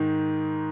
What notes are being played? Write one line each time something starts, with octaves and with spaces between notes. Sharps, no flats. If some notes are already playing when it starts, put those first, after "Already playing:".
Already playing: G#2 D#3